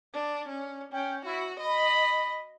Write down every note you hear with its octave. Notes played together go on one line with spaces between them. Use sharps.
D4
C#4
C#4 G5
E4 F#4
D#5 B5